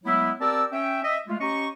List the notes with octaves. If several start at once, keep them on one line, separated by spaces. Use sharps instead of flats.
F#3 G#3 A3 B3 E4
C4 G4 A#4 D5 A5 E6
C#4 E5 G5
D#5 E5
G#3 A3 F4
C#4 G4 D#5 A#5 C#6